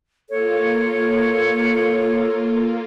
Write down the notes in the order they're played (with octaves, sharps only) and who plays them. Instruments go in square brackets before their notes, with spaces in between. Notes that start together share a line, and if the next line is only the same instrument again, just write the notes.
[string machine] A#3 F4 [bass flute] A4 [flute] C#5